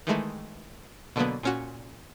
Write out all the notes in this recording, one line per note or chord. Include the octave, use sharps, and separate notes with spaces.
D#3 E3 G#3 A3
B2 D3 F#3 A#3 B3
A#2 C#4 F#4